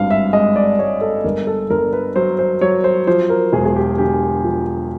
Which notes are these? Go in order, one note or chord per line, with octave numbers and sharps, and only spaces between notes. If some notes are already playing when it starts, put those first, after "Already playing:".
Already playing: G#1 G2 F5
E5
G#3 D#5
D5
G#3 C#5
A4
G1 A#4
A4
G1 A#4
B4
F#3 C5
C5
F#3 C#5
C5
F3 C5
A#4
E1 G#4
G#4
G4
D3 G4
F3